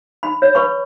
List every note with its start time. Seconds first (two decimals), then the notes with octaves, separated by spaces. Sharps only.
0.23 B5
0.42 C#5
0.55 B4 B5 C#6